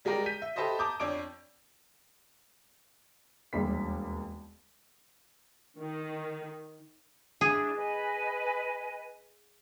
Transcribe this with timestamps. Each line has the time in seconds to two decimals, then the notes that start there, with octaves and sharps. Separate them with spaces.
0.05 G3 G#3 G4 A#4 D5
0.26 G6 B6 D#7
0.42 E5
0.56 G4 A4 B4 C5 D#5 E5
0.79 A5 A#5 D6 D#6 G6
1.00 F2 D4 C#5 D6 D7
3.53 E1 D#2 G3 B6
5.80 D#3
7.41 D4 E4 G#4
7.75 B4 D#5 G#5